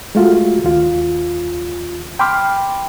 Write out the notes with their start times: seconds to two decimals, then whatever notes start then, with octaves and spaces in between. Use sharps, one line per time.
0.15 G#3 A3 F4 F#4
0.64 D#2 F4
2.19 G5 B5 C6 D6 F6